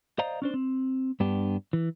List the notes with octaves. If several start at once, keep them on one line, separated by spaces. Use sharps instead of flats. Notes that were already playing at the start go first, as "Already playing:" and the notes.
C5 D5 D#5 F5 A#5
C#4 D4 C5
C4
G2 B3 D4 G4
E3